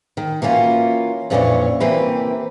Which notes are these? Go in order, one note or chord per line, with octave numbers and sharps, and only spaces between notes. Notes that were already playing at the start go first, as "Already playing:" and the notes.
D#3
E3 A#3 C#4 F4 F#4
F2 A#2 E3 C#4 D4 C#5
C3 E3 A#3 G4 B4